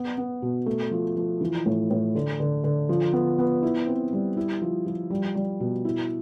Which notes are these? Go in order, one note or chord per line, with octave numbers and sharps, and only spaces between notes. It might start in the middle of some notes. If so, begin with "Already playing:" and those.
Already playing: B3
B3
B2
A3
F3
F3
E3
A2
A2
D3
D3
D3
F3
B3
B3
E4
C4
G3
E4
F3
F3
G3
G3
B2
E4